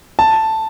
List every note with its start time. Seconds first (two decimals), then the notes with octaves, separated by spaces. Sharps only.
0.19 A5